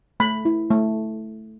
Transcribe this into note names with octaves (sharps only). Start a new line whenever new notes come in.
A3 B5
E4
A3